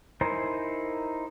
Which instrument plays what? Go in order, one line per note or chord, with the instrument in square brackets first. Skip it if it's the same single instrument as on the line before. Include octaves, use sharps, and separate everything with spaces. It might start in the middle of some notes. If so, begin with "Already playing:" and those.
[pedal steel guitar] D#4 E4 A#4 C5 G#5